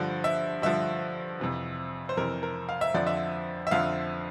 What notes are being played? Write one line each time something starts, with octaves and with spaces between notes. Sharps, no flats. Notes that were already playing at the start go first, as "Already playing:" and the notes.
Already playing: G2 D3 F3
E5
G2 D3 F3 E5
F2 C3 E3
C5
F2 C3 E3 A#4
A#4
F5
E5
F2 D3 F3 D5
E5
E5
F2 D3 F3 F5